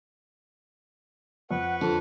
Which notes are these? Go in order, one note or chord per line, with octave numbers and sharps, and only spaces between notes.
F2 B4 F#5 C#6
F2 D3 A5